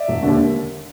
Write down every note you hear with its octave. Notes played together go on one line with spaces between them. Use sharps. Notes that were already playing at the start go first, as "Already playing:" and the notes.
Already playing: D5 E5
E1
D#2 D3